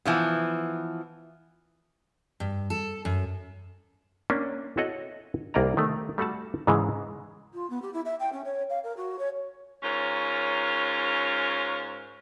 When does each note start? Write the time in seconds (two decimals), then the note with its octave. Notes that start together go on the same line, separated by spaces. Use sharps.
0.05 E3 F3 B3
2.40 G2
2.70 A4
3.05 F#2
4.30 A#3 C#4 D4
4.77 E4 F#4 A4 C#5 D#5 F#5
5.54 C2 A#3 D5 D#5 A#5
5.77 D#3 A3
6.18 G3 A3 F#4 F#5 A5
6.67 G#2 C#3 E3 G#3
7.54 F4
7.70 B3
7.82 G4
7.93 E4
8.05 E5
8.20 G5
8.32 C#4
8.44 C#5
8.70 F5
8.84 A#4
8.97 F#4
9.19 C#5
9.83 G#2 C#4 F4 A#4 C#5